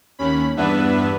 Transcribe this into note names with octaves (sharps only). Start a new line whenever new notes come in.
D#2 C#4 B5
E2 G2 B3 D4 B4 E5